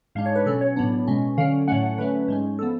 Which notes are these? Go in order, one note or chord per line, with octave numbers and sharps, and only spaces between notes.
G#2 G#3 D4 F5
C#5
B4
B2 F#3 C#4 A4
C#5
A2 F#3 B3 D4
B2 G#3 C#4
D3 F#3 C#4 F5
A2 F#3 A3 C#4 F#5
F#5
D3 F#3 A3 C#4 B4
G#2 G#3 C#4
F3 B3 A4